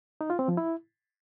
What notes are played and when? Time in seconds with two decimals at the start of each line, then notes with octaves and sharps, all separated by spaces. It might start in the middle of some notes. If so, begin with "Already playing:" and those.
0.21 D#4
0.30 F4
0.39 C4
0.48 F3
0.57 E4